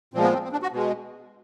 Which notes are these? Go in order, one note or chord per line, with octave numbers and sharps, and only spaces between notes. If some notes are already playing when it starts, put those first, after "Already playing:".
A#2 F3 G#3 C4
B3
C4
C4
D4
F#4
B2 G#3